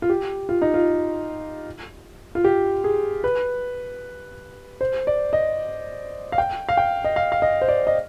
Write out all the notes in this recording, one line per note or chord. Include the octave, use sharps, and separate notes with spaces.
F4
G4
F4
D#4
F4
F4
G4
G#4
B4
C5
D5
D#5
F5
G5
F5
G5
D#5
F5
F5
D#5
C5
D5
D#5